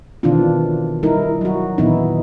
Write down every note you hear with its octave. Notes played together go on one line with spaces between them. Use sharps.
B2 D#3 E3 C4 D4 F4
G3 D#4 E4 A#4
F#3 F#4
A#2 D#3 E3 B3 D#4 E4